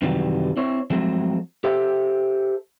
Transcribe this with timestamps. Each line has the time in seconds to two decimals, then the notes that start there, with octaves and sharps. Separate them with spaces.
0.02 F#2 C3 D#3 E3 F#3 G3
0.57 C4 E4 C5 C#5
0.90 F3 F#3 G#3 A3 C4
1.64 G4 A4 C5 E5